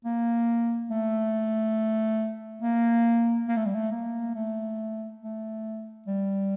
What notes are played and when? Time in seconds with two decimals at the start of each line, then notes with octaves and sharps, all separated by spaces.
0.05 A#3
0.90 A3
2.62 A#3
3.48 A#3
3.57 A3
3.66 G3
3.75 A3
3.91 A#3
4.35 A3
5.21 A3
6.07 G3